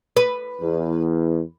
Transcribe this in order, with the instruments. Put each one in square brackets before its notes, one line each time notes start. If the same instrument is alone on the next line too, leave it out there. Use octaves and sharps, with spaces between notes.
[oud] B4
[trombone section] E2